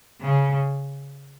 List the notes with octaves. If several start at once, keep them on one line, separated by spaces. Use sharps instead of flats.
C#3